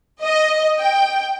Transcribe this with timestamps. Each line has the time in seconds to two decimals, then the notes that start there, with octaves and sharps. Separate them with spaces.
0.22 D#5
0.80 G5